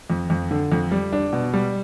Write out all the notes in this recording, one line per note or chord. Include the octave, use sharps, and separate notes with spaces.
F2
F2
D3
F2
G3
D4
B2
G3